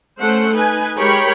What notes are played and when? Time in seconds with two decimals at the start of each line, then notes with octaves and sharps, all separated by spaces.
0.20 A3 C#4 A4 C5 F#5
0.53 D#4 B4 G#5
0.99 G#3 G4 A#4 C#5 G5 B5